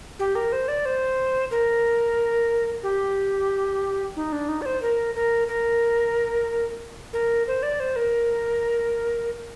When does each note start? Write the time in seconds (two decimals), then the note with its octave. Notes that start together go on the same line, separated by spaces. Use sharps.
0.19 G4
0.35 A#4
0.52 C5
0.68 D5
0.86 C5
1.51 A#4
2.83 G4
4.16 D#4
4.32 D4
4.49 D#4
4.62 D5
4.66 C5
4.82 A#4
5.15 A#4
5.48 A#4
7.13 A#4
7.47 C5
7.63 D5
7.80 C5
7.96 A#4